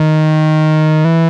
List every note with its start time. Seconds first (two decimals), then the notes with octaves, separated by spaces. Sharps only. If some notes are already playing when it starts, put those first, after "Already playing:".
Already playing: D#3
1.05 E3